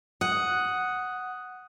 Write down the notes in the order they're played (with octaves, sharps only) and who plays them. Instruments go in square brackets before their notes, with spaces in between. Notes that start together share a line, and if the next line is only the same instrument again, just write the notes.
[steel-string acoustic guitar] F#5 [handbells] D#6 F#6